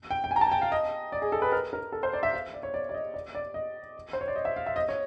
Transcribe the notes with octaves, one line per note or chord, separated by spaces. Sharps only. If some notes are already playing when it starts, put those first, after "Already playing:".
G5
G5
G#5
A#5
A5
G#5
G5
F5
D#5
D5
G#4
A4
B4
A#4
A#4
A4
C5
D5
E5
F5
D5
C#5
D5
D5
D#5
D5
D5
D#5
C5
C#5
D5
D#5
E5
F5
E5
D#5
C#5